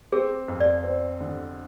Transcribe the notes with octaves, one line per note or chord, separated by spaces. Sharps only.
C4 G#4
F2
D5
C4
D3